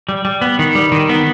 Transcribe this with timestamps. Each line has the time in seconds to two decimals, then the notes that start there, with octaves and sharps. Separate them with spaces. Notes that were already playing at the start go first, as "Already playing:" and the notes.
0.09 G3
0.25 G3
0.42 B3
0.59 D#3
0.75 G3
0.92 D#3
1.09 B3